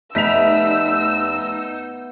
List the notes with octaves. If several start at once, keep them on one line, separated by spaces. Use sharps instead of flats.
F1 B3 D#4 E5 E6 B6 F7